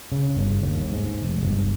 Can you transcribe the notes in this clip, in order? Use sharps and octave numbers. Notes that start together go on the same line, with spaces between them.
C#3
G1
D#2
G#2
F1
G1